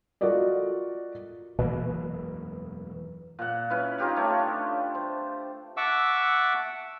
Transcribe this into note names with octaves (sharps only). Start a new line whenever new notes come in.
F4 F#4 A4 A#4 D5 D#5
E1 F#2 B2 E3 A#3 B4
A#2 F#5
C#4 E4 B4
D#4 F4 G4 F5
A3 C#5
D4
C5
E5 F#5 A5 C#6 D6 E6